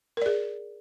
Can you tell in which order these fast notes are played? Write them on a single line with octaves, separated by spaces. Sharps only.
A#4 D5 G#4